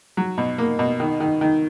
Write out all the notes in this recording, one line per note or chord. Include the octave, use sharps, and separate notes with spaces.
F#3
B2
A#3
B2
D#3
D#3
D#3